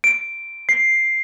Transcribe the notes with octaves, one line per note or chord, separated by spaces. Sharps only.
D7
C7